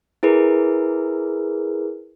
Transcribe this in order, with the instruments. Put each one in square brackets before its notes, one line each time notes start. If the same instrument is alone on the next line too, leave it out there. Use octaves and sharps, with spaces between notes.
[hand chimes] E4 G#4 A#4 B4